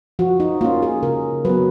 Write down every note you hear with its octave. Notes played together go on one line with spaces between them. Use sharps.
F3 F#4
D#4
A#3 C#4 F4
G#4
C#3 A#4
F#3 B3 B4